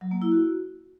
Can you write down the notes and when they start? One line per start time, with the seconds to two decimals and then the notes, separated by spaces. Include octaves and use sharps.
0.01 F#3
0.11 A#3
0.22 E4
0.32 F#4